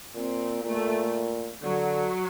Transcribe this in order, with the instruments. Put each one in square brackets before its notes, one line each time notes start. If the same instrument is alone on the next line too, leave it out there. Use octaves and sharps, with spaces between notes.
[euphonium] A#2 [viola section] C4
[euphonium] A#2 [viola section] A3
[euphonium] D3 [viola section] F#3